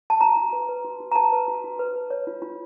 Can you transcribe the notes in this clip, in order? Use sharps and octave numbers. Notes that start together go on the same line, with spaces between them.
A5
F#4 A#5
F#4
B4
B4
F#4
F#4
A#5
B4 A5
B4
F#4
F#4
B4
B4
C#5
F4
F4